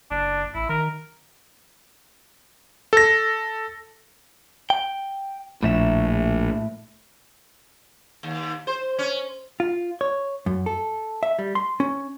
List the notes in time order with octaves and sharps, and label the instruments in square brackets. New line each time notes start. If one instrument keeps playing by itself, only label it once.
[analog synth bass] F#1 [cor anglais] D4
[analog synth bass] A1 [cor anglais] E4
[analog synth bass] D#3 [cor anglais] A#4
[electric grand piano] A4 A#6
[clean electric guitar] G5
[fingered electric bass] A#1 [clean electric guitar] A2 A3 E5
[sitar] D#2
C5
C#4
[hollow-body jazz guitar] F4
C#5
F#2
A4
E5
G3
C6
C#4